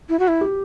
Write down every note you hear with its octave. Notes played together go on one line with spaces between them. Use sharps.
E4
F#4
E4
G4